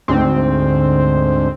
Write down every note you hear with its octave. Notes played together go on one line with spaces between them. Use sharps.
D2 G#2 C4